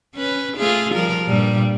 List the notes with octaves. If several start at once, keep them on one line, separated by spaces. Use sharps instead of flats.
C#4 B4
A3 F4 G#4
F3 G3 A#4
G2 A#2 G3